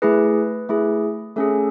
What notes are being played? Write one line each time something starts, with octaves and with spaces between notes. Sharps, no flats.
A3 E4 G#4 B4
A3 E4 G#4
A3 C#4 G#4 A4